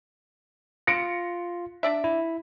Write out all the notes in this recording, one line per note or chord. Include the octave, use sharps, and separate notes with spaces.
F4 A#6 C#7 D7
D4 D5 E5
E4